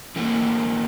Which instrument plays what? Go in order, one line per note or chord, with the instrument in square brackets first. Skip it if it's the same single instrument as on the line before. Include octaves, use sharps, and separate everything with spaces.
[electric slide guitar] E3 A3 A#3